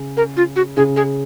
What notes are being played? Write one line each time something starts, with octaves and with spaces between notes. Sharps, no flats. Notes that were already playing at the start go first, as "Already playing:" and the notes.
Already playing: C#3
A#4
F4
F#4
C#3 G#4
G#4